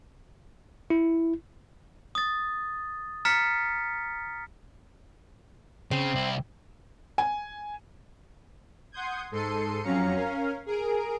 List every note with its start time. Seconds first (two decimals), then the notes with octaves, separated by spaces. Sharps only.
0.90 E4
2.15 D#6 A6
3.25 A#5 F6 A6 B6 C#7
5.91 C#3 C4
6.16 C2 E4
7.18 G#5
8.92 F#5 C6 D#6 G6 G#6
9.31 G#2 A4 C6 C7 C#7 D#7
9.83 F2 F#3 C#4 F5 A#5 C#7
10.15 C#4 A#4 F5
10.66 G#4 A#4 D7